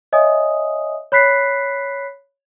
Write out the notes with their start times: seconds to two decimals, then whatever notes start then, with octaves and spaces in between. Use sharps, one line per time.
0.13 C#5 D#5 E5 G#5 D#6
1.12 C#5 B5 F#6 B6 C7